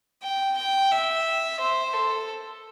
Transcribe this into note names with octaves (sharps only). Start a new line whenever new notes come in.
G5
G5
E5
C5
A4